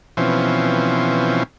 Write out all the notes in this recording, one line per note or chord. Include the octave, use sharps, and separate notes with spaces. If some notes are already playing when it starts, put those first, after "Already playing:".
B2 E3 F3 C4 C#4